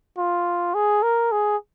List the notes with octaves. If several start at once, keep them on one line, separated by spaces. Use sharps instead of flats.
F4
G#4
A#4
G#4